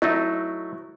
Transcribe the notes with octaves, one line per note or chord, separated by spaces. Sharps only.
F#3 A3 D#4 E4